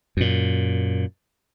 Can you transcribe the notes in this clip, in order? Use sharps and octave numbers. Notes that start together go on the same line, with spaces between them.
F#2 A#2